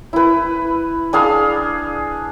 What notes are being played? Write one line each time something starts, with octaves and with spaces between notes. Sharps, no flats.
E4 B4
D4 G#4 F5 B5